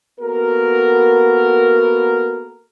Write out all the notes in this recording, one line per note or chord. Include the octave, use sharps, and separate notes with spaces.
A#3 B3 F#4 A4 A#4